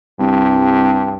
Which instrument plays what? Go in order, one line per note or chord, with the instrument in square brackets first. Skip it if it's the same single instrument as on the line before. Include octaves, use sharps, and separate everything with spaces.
[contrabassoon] C2 [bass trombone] G2